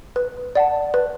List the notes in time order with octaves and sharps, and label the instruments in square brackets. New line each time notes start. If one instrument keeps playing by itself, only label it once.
[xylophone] B4
D5 F#5 A5
B4